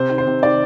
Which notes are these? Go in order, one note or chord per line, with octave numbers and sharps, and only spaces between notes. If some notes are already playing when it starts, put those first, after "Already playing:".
Already playing: C3 C5
D#3
C5
C3
D#3 D5